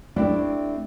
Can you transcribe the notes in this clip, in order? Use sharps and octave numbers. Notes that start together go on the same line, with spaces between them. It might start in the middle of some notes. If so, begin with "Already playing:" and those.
A3 C4 D4 E4 G4